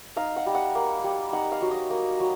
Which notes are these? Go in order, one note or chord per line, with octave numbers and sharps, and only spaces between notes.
D#4 F5
F#5
G3
F#5
A#3
G3
D#4 F#5
F5
F#3
D#5
A#3 D#5
F#3